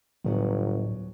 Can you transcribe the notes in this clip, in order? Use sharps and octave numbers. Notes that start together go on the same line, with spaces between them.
G1 D2 A2 F#3 B3